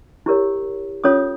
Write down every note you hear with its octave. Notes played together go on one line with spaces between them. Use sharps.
E4 G4 A#4 C#5
C#4 F4 A4 C#5 D#6